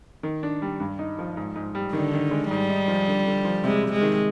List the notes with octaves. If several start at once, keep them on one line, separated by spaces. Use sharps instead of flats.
D#3
D4
G3
G2
D#4
F3
G#2
G#2
G3
D3 D#3
D#3
G#3
G#2 G3
D#4
F3
D3
D3
F3
C3 G#3
C3
G#3
D#3